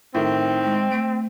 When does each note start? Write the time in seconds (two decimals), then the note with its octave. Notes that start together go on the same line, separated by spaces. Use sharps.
0.14 A2 D#3 C4
0.64 G#3
0.91 A3 D7